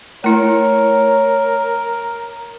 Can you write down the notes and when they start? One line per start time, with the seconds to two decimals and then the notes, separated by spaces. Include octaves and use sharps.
0.24 A3 E4 A#4 C#5